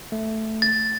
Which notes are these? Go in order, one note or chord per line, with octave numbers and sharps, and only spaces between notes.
A3
A6